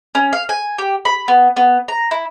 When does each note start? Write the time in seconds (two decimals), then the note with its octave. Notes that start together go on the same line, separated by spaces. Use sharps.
0.15 C#4
0.33 F5
0.49 G#5
0.78 G4
1.05 B5
1.28 B3
1.56 B3
1.88 A#5
2.11 E4